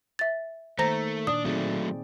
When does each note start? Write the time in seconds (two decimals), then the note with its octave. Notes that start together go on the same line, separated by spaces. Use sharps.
0.19 E5 A6
0.79 D#3 A3 A#3 C5 A#5 A#6
1.27 A#2 D4 D5 D#6
1.45 F#3 A3 C4 D#4 G#4